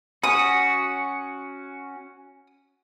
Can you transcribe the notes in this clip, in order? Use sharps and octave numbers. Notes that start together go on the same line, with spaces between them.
C#4 F#4 D#6